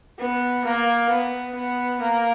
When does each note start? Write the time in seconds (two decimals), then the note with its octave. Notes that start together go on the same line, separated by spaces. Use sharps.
0.19 B3
0.64 A#3
1.09 B3
1.54 B3
2.00 A#3